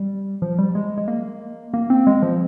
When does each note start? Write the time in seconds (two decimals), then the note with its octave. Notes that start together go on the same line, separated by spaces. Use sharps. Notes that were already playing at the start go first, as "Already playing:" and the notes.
Already playing: G3
0.42 F3
0.59 G3
0.75 G#3
0.98 G#3
1.08 A#3
1.74 A#3
1.90 C4
2.07 G#3
2.22 F3